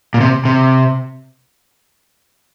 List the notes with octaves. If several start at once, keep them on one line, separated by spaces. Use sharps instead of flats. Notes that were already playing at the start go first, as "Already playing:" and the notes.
A#2
C3
C3